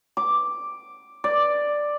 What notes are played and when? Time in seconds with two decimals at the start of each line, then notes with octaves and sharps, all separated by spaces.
0.17 D6
1.24 D5